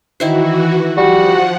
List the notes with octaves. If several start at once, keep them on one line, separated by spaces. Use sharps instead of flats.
D#3 E3 E4 F#4 C5
F3 G3 F#4 F#5